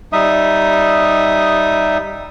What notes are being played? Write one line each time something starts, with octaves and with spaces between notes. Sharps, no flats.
G3 D#4 E5 D#6